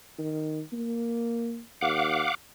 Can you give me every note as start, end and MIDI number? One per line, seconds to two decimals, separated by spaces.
0.18 0.62 51
0.72 1.62 58
1.81 2.27 39
1.81 2.35 77
1.81 2.35 78
1.81 2.35 86